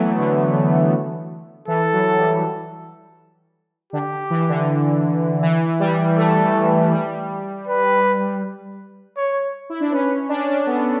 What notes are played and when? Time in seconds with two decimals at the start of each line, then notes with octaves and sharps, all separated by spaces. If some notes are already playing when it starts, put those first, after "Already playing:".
Already playing: E3 F#3 A3 B3
0.18 D3
1.68 E3 A4
1.93 F#3
2.18 G3
3.93 D3 G4
4.30 E3
4.49 D3
5.43 E3
5.80 G3
6.18 A3 A4
6.92 G3
7.68 B4
9.17 C#5
9.70 E4
9.80 D4
9.92 C#4 B4
10.29 D4
10.38 C#4
10.47 D4
10.67 B3 A4